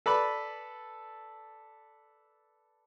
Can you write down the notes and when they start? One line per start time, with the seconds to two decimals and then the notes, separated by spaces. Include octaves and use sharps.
0.06 A4 B4 D5 B5